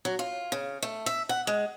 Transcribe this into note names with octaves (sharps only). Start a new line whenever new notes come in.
F#3
F4
C#3
A3
E5
F#5
G#3